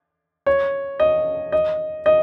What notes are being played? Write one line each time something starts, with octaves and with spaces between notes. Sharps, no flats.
C#5
D#5
D#5
D#5